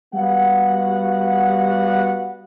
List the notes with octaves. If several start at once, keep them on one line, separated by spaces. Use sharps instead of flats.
G3 B3 F#4 F5 F#5